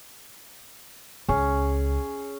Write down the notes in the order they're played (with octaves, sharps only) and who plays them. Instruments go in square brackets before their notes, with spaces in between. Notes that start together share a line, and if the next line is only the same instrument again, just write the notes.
[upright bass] C#2 [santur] C#4 G#4